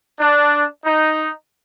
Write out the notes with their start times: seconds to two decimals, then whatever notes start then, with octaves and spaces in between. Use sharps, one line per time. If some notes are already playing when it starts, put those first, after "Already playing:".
0.19 D4
0.83 D#4